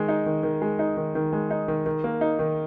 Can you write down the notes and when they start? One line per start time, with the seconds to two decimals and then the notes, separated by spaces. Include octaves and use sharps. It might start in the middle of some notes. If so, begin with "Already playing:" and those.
Already playing: D#3 G#3
0.08 D#4
0.26 D#3
0.43 D#3
0.62 G#3
0.79 D#4
0.97 D#3
1.15 D#3
1.33 G#3
1.51 D#4
1.68 D#3
1.86 D#3
2.04 A#3
2.21 D#4
2.39 D#3